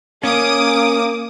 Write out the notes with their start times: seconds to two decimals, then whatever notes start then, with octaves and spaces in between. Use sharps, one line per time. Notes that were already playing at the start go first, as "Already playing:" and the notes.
0.23 A#3 C#4 D6 D#6